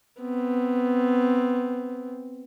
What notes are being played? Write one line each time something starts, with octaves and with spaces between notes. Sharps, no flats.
B3 C4